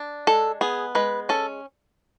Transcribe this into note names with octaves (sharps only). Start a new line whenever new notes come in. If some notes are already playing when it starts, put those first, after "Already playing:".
Already playing: D4
G#3 A4
B3 G#4
G#3 B4
C#4 A4